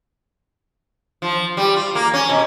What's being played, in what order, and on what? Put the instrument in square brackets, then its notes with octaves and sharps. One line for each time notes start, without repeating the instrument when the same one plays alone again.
[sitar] F3
G3
F4
A#3
C#4
B2